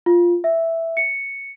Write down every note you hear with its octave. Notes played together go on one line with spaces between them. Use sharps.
F4
E5
C#7